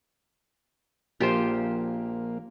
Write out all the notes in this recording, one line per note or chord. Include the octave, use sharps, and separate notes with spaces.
A#1 A#3 F4 G4 C5